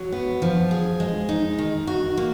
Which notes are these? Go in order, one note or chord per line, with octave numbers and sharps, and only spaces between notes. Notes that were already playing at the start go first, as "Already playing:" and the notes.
Already playing: F#3
B3
F3
G#4
G#3
D#4
D#3
F#4
A#3